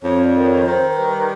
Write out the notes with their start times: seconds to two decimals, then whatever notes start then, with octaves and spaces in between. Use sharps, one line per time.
0.02 F2 C#5
0.24 D5
0.34 D#3
0.45 C#5
0.65 D#3 C5
0.90 C5
0.97 G3 B4